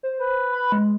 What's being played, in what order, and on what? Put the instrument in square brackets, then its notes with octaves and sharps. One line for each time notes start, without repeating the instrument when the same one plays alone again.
[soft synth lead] C5
[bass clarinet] B4
[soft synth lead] B5
G#3